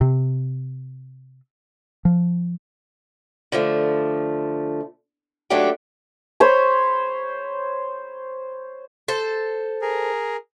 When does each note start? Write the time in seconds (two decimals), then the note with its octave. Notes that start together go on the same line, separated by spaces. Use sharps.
0.01 C3
2.05 F3
3.52 D3 F3 G#3 A3
5.50 D#2 F#3 A3 D4 G4 G5
6.40 C5 C#5 B5
9.08 A4 C5
9.82 G#4 A#4